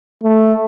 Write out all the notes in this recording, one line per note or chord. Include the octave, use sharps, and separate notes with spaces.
A3